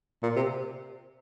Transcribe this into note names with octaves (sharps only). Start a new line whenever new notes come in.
A#2
C3